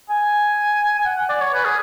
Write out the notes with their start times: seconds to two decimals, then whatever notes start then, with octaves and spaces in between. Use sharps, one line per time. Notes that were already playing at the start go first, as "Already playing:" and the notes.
0.09 G#5
0.99 G#5
1.05 F#5
1.17 F#5
1.29 D5
1.41 C#5
1.53 B4
1.65 G#4